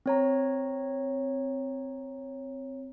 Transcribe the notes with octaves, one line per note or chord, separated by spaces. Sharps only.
C4 C#5 A#5